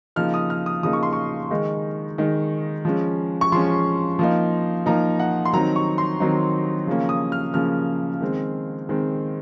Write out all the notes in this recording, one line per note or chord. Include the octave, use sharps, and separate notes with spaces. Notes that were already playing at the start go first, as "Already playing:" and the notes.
C#3 F3 A#3 D#4 F6
D#6
F6
D#6
C#3 F3 A#3 D#4 D#6
C#6
C6
C#6
D#3 G#3 D#4
D#3 G#3 D#4
F3 G#3 C#4
C#6
F3 G#3 C#4 C6
F3 A#3 D#4
F3 A#3 D#4 A#5
F#5
C6
D#3 F#3 C4 D#4 A#5
C#6
C6
D#3 F#3 C4 D#4
C#3 F3 A#3 C#4
D#6
F6
C#3 F3 A#3 C#4 F6
D#3 G#3 C4
D#3 G#3 C4